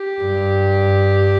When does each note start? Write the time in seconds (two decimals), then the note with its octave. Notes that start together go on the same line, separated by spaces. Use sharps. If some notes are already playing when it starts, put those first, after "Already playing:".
Already playing: G4
0.21 G2